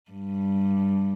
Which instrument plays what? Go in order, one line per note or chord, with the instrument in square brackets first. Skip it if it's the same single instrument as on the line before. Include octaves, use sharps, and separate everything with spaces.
[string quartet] G2